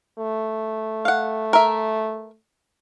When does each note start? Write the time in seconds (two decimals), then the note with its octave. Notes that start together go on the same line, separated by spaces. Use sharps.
0.19 A3
1.05 F5 F#5
1.53 A#4 E5